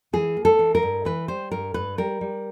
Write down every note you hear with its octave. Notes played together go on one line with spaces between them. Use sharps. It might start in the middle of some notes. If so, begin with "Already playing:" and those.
E3 G#4
A#3
A4
E3
A#4
G2
E3 B4
G3 C5
G2 A#4
G2 B4
G3 A#4
G3